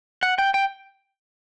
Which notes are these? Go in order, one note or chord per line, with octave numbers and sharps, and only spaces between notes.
F#5
G5
G5